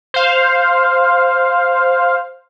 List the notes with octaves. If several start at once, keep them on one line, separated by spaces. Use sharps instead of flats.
C5 F5